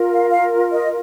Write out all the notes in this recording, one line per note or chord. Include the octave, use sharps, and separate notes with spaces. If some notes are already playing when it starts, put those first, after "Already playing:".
Already playing: F4 A#4
F5
F5
D#5